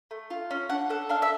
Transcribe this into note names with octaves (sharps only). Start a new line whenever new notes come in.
A3
F4
C#4
D4 F#5
A4 F#5
D4 F5
E5